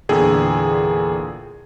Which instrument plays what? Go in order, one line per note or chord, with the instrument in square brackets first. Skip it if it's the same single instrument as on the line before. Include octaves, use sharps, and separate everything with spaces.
[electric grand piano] E2 A#2 D3 G#4 A4 G5